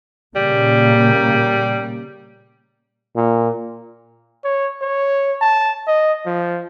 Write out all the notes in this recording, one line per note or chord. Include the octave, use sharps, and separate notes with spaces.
A#2 C#3 G3 A#3
A#2
C#5
C#5
A5
D#5
F3